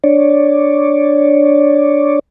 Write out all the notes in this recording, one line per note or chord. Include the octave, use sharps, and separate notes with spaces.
D4 C#5 D5